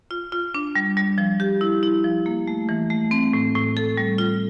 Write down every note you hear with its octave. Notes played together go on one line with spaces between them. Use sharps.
F4
F4
D4
G3
G3
F3
G4
E4
E4
F3
A#3
A3
E3
A3
C4
A2
A2
A4
G3
F4